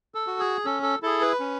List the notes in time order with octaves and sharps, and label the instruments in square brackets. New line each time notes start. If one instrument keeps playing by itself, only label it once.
[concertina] A4
F#4
G#4
C#4 A4
A4
E4 G#4 A4
B4
C#4